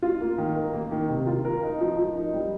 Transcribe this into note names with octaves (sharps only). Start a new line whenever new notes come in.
F4
A#3
D#3
A#4
A#3
D#3
C3
F4
A#4
D#4
F3
F3
D#4
G3